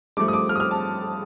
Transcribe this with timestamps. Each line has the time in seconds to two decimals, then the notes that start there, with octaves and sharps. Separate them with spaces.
0.17 G2 F3 A3 D6
0.28 D#6
0.33 D6
0.49 F6
0.55 D#6
0.60 F6
0.71 A5